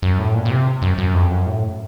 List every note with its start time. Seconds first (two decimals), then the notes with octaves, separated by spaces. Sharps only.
0.02 F#2
0.19 A2
0.34 A#2
0.45 A#2
0.51 C3
0.82 F#2
0.98 F#2
1.14 F2
1.30 F#2
1.47 A2